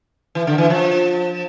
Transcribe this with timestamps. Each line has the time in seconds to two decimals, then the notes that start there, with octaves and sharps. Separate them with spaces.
0.35 E3
0.47 D3
0.58 E3
0.70 F3